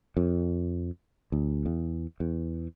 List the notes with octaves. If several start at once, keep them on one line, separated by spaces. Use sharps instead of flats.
F2
D2
E2
E2